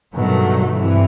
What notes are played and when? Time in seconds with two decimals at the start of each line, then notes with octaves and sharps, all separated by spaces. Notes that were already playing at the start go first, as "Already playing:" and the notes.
0.14 G2 B2 D#3 F#3 A3
0.76 G2 C3 E3